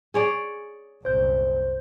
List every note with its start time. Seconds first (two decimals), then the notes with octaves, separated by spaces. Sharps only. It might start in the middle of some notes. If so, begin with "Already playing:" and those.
0.14 G#4 C#5 D5
1.05 F#1 C2 A#2 C5 G6